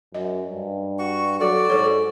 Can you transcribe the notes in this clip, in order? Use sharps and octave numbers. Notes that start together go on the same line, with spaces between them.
F#2 D#5
G2
F#4 C#6
F#3 F#4 A4 D5
G#2 A4 C#5